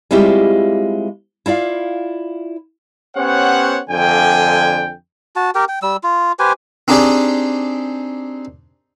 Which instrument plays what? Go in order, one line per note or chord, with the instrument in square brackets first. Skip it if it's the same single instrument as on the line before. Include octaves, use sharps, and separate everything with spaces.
[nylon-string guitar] G3 G#3 C4 E4 F4 G4
E4 F4 D5 F5
[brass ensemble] B3 C#4 G4 C5 C#5 F#5
F2 D3 G5 G#5
[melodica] F#4 A5
G4 A#4 G5
G5
G3 E6
F4
G4 B4 C5 G#5
[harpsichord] C4 D4 D#4 G4 G#4 D5